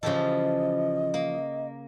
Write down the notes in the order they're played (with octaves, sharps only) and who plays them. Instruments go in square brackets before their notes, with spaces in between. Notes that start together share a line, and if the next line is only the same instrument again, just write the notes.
[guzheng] C#3 G4 A4 [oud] E3 F3 [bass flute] D#5
[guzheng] A#3